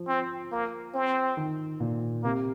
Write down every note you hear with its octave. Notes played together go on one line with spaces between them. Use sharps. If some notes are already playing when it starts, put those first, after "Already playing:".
Already playing: F3
C4
A#3
C4
D#3
A#2
C3 A#3